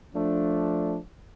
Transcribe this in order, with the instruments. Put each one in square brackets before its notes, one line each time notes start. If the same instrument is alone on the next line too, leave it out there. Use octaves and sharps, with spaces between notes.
[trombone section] F3 A3 D4